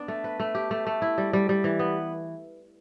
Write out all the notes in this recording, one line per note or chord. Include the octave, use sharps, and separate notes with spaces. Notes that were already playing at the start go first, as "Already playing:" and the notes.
Already playing: B3 D4
A3
B4
A3
G4
A3
A3
E4
G3
G3
G3
E3
B3